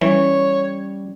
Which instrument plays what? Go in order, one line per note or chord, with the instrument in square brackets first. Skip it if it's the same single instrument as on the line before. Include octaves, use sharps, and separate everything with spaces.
[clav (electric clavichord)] E3 [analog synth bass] G3 [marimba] C#4 [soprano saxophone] C#5